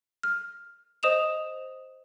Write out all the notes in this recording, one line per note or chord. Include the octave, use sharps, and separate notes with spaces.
F6
C5 D#5 D#6 E7 F7